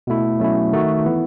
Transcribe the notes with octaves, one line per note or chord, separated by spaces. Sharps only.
B2 A3 E4
B2 F#3 A3 C#4 E4
D#3 A3 D#4 F#4
E3 B3 E4